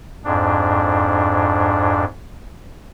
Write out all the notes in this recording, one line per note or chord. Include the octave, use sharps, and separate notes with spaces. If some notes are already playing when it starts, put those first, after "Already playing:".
F2 G#2 D4